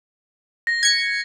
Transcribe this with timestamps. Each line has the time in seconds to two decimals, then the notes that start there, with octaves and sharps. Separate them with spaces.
0.67 A#6
0.83 G#6 C#7